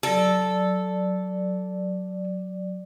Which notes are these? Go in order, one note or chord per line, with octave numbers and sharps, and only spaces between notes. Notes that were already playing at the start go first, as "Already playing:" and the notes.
F#3 A4 D5